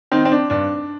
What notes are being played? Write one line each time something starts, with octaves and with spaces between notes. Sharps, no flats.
D#3 C4 D#4
C4
D4
G2 D4